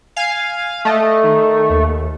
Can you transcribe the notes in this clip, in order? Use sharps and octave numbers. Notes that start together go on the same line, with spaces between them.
F5 G#5
A3 D#5
D#3
D#2